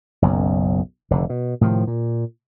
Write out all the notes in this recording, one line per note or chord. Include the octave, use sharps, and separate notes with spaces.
F#1 B1 F#2
F1 D3
B2
A2 C3 D#3 F3
A#2